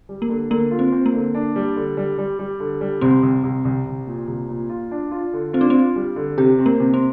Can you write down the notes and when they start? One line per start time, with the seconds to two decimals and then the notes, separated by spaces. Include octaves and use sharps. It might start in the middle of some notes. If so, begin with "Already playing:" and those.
0.09 G3
0.22 A#3
0.29 D3
0.50 D3 A#3
0.71 F4
0.79 C4
0.92 C4
1.06 A#3
1.13 D3
1.34 D4
1.56 G3
1.76 D3
1.97 G3
2.18 G3
2.39 G3
2.60 D3
2.81 G3
3.01 C2 C4
3.23 C2
3.43 C2
3.65 C2
3.86 C2
4.07 A#2
4.28 C2
4.49 A#2
4.69 F4
4.91 D4
5.11 F4
5.33 D3
5.53 C4 F4
5.61 D4
5.70 C4
5.74 F4
5.96 G3
6.16 D3
6.38 C3 G4
6.59 C4
6.66 A#3
6.80 C3
6.94 C4